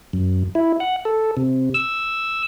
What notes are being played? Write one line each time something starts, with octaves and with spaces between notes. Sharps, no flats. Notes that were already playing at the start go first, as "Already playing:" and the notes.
F#2
E4
F#5
A4
C3
E6